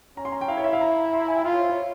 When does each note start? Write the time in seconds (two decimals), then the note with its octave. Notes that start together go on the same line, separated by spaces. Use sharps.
0.17 C#4 A#5
0.25 C6
0.32 A#5
0.41 G5
0.48 E4 F5
0.57 C#5
0.64 E5
0.73 F5
0.81 A#5
1.13 C6
1.21 A#5
1.28 G#5
1.36 G5
1.45 F4 F5
1.53 C#5
1.61 C5
1.70 C#5